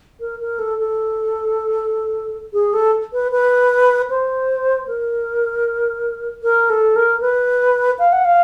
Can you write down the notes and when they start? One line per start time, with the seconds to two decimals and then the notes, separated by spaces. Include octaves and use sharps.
0.20 A#4
0.39 A#4
0.59 A4
0.78 A4
2.53 G#4
2.73 A4
3.13 B4
3.32 B4
4.10 C5
4.87 A#4
6.43 A#4
6.70 A4
6.96 A#4
7.21 B4
7.99 F5
8.12 F#5
8.25 F5